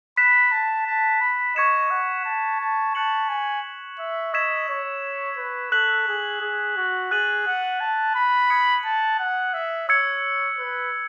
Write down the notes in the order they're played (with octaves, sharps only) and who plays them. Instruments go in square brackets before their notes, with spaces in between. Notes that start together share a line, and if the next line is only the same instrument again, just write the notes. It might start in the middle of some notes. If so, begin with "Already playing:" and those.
[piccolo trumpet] B5 [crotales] F#6 B6 E7
[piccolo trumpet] A5
A5
B5
[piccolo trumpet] D#5 [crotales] C#6 G#6 C#7 E7
[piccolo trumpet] F#5
A5
A5
[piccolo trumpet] A5 [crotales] F#6 C#7 F#7
[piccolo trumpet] G#5
E5
[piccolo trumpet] D#5 [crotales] C#6 E6 G#6 B6 E7
[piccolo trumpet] C#5
B4
[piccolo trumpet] A4 [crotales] F#6 B6 F#7
[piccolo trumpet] G#4
G#4
F#4
[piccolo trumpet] G#4 [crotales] F#6 A6 D#7 F#7
[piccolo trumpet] F#5
A5
B5
[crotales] D#6 G#6 C#7 F#7
[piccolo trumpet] A5
F#5
E5
[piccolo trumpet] C#5 [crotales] E6 G#6 C#7
[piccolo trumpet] B4